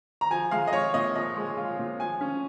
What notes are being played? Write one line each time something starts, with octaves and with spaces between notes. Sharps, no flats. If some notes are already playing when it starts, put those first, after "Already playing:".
A#5
F3 G#5
G#3 F5
D#5
F4 C#5
A#2 D#5
F3 D#5
G#3
F4
A#2
F3 G#5
C#4